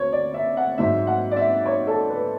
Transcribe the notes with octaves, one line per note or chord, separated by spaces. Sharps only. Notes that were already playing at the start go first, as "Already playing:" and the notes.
Already playing: D2 C#5
D5
E5
F#5
G#2 F#3 E5
F#5
D5
E5
C#5
A4
B4